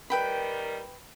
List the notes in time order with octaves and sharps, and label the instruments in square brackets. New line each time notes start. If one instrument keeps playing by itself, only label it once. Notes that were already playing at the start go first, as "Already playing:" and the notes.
[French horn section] D#3 G3 A#4 [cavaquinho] B4 G5 B5